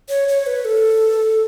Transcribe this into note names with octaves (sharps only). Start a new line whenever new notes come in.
C#5
C#5
B4
A4